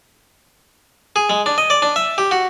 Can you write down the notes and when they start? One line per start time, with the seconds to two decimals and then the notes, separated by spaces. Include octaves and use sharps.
1.16 G#4
1.30 G#3
1.46 D4
1.58 D#5
1.70 D5
1.82 D4
1.96 E5
2.18 G4
2.31 F#4